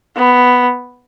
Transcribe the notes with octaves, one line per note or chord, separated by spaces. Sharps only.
B3